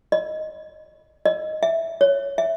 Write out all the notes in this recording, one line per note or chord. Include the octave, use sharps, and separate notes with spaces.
D#5
D#5
E5
C#5
E5